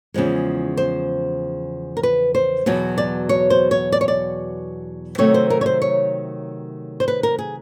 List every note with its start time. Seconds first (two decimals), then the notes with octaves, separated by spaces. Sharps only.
0.14 E2 C#3 F3 G#3
0.77 C5
1.97 A#4
2.03 B4
2.35 C5
2.66 E2 B2 F#3
2.98 D5
3.29 C#5
3.50 C5
3.71 C#5
3.92 D5
4.01 C#5
4.08 D5
5.18 C3 D#3 F#3 A3 C#5
5.34 C5
5.50 A#4
5.61 C#5
5.66 C5
5.82 C#5
7.00 C5
7.08 B4
7.23 A#4
7.39 G#4